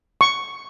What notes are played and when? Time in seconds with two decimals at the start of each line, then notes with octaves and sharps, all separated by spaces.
0.21 C#6